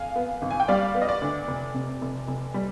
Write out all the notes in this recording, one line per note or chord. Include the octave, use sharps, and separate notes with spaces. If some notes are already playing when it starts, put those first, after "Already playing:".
Already playing: F2 F5 G#5
B3
G#1
G#5
G5
G3 D5 F5
B3
D#5
D5
D2
F1
C3
F1
F1
G3